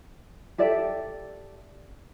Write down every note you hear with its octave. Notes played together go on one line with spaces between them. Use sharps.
G4 A4 D5 E5